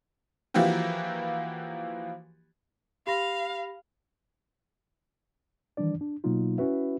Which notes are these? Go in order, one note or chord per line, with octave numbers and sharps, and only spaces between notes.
E3 F3 A#3 E4 F#4 G4
G4 F5 B5 A#6
D#3 E3 G3 D4 D5
D4
B2 F#3 A#3 D#4 F4
C#4 E4 F#4 B4 E5